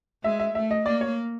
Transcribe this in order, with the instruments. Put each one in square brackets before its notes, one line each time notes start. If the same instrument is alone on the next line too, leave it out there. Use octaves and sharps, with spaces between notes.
[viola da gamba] G#3 [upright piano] E5
[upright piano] E5
[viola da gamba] A3 [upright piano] E5
[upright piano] D#5
[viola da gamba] A#3 [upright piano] D5
[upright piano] C#5